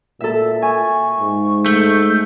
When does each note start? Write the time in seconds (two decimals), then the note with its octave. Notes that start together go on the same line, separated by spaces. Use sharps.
0.21 A#2 A4 E5
0.62 G#5 C#6
1.19 G#2
1.66 A3 G6